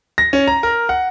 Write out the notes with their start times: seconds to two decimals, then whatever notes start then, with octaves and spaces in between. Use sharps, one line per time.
0.18 A#6
0.33 C#4
0.48 A#5
0.63 A#4
0.89 F#5